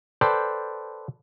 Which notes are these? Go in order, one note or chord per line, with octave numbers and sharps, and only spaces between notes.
A4 B4 C5 D5 G5